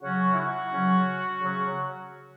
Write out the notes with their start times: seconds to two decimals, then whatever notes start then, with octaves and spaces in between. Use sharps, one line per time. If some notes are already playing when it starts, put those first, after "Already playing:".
0.03 C#3 F#3 C#4 F#4
0.33 E4
0.38 F#4
0.73 C#3 F#3 C#4
1.41 C#3 F#3 C#4